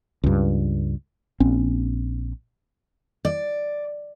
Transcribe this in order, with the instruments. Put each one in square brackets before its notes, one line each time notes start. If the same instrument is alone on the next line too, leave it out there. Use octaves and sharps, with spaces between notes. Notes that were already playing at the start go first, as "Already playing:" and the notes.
[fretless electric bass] C#2 G2
A#1 C4 C#4
[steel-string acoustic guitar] D5